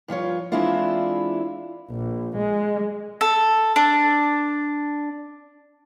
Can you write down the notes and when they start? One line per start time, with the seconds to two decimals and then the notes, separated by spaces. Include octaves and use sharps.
0.08 G2 F3 F4 C#5
0.52 E3 G#3 C4 D4 E4 F4
1.91 A#1
2.38 G#3
3.21 A4
3.76 D4